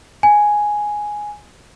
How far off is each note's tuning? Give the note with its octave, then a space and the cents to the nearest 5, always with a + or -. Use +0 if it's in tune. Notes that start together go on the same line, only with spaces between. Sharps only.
G#5 +5